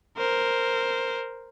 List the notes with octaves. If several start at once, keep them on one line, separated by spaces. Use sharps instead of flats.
A#4 C5